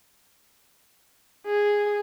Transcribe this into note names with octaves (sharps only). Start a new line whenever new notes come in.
G#4